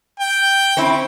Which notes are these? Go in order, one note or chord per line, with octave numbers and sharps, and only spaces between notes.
G5
C4 C#4 E4